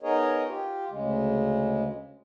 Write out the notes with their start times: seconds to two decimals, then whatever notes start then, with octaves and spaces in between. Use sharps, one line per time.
0.03 B3 D#4 G#4 A#4 C#5 D#5
0.47 F4 G4
0.90 D2 C#3 G#3